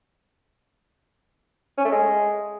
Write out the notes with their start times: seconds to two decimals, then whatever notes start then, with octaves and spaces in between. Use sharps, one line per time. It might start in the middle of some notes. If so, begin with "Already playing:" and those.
1.78 C#4
1.85 A3
1.92 G#3